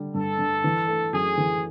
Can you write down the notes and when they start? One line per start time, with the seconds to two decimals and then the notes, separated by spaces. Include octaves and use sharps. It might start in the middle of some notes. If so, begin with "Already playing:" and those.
Already playing: D3 G3
0.14 G2 A4
0.39 G2
0.64 E3
0.88 A3
1.13 F#2 G#4
1.38 E3